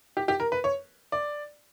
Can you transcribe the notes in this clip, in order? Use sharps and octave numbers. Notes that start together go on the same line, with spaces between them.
G4
G4
A#4
B4
C#5
D5